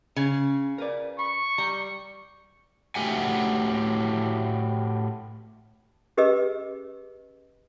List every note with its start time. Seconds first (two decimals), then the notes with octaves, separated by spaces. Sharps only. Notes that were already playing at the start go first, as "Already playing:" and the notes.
0.16 C#3 C#4
0.78 A#4 B4 D5
1.19 B5 C#6
1.58 G3 A#5
2.95 A2 A3 F#4 G4 F#5 G#5
6.17 C#4 G4 G#4 B4 D#5 E6